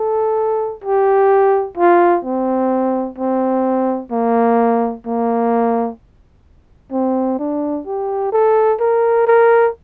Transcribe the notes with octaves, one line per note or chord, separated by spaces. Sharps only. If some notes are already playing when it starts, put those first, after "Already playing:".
Already playing: A4
G4
F4
C4
C4
A#3
A#3
C4
D4
G4
A4
A#4
A#4